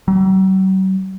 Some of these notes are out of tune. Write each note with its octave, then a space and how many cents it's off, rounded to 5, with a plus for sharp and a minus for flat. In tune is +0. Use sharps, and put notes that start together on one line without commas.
F#3 +45